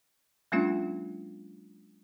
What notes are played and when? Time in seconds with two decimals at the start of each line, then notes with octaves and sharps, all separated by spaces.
0.52 F#3 G#3 A#3 C#4 D4 F4